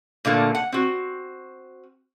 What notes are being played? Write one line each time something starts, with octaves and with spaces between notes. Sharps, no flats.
A#2 D3 A3 A#3
F#5
C4 F#4